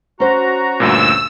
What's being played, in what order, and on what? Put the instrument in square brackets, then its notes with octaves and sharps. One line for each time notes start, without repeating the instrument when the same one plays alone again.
[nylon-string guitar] C#4 C5 [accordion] F#4 A#5
[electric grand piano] D2 G2 A#2 [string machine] E6